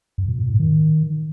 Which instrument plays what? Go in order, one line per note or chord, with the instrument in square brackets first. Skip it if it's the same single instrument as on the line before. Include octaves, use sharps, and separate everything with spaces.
[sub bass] F#2
A#2
A#2
G#2
D#3